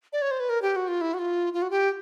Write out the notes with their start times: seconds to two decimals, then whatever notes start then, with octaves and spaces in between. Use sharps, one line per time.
0.13 D5
0.22 C#5
0.31 C5
0.40 B4
0.49 A#4
0.62 G4
0.76 F#4
0.88 F4
1.01 E4
1.14 F#4
1.19 F4
1.54 F4
1.62 F#4
1.70 G4